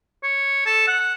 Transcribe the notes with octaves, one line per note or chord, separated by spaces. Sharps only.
C#5
A4
F#5